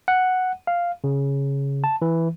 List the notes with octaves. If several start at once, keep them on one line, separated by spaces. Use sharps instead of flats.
F#5
F5
C#3
A5
E3